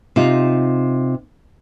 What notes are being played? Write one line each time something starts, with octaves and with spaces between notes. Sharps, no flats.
C3 D#4 F4